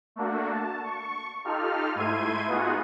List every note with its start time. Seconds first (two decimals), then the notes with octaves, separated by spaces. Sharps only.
0.16 A3 A#3 D4 F#4
0.52 A5
0.84 C#6
1.44 D#4 F4 G4 A4 F6
1.95 G#2 A3 E4 C6 G#6 D#7
2.47 B3 D#4 F4 F#4 G#4 F#5